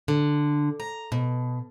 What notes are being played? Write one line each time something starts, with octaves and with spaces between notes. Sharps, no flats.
D3
A#5
B2